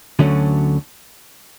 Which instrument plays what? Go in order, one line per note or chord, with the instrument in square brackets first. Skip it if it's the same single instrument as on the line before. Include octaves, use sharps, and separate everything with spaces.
[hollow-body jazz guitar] D2 D3 F#3 A3 C#4